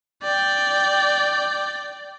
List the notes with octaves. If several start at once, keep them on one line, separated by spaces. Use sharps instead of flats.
D5 G5